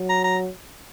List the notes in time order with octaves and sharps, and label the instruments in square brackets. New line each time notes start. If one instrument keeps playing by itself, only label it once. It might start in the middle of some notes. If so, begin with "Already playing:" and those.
Already playing: [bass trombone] F#3
[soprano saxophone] A#5
A#5